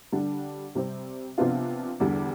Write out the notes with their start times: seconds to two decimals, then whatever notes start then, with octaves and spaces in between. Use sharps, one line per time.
0.12 D3 G3 D4
0.75 C3 G3 C4
1.38 C3 F3 B3 D4 F4
2.00 E2 D3 G3